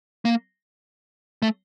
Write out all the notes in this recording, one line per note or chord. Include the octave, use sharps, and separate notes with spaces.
A#3
A3